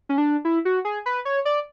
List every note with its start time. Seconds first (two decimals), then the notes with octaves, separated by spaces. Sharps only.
0.09 C#4
0.18 D4
0.45 E4
0.65 F#4
0.85 G#4
1.06 B4
1.25 C#5
1.45 D5